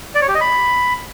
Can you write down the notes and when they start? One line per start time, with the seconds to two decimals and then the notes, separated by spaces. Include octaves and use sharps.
0.15 D5
0.22 C#5
0.28 G4
0.35 D#5
0.41 B5